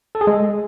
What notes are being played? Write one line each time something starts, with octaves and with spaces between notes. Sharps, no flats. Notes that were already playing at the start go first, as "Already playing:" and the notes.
A4
G#4
G#3